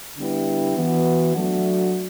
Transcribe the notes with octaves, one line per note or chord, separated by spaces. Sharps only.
D3 G3 B3 E4
E3 B3 F#4
F#3 A3 D4 F#4